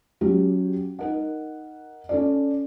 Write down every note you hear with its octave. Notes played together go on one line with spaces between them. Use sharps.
F#3 C#4 G4
D#4 A#4 F#5
C#4 A4 D5